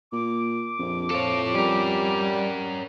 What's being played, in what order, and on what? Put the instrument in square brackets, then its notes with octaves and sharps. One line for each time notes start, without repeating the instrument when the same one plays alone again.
[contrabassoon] A#2 [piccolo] D6
[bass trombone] A#1 [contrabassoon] F2
[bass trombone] F3 [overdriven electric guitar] A4 C#5
[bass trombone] G3 [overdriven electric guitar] C#4 A#4